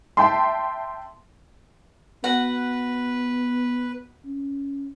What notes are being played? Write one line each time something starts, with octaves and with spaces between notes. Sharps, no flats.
E5 G5 A5 C6
B3 F#4 B4 F#5
C#4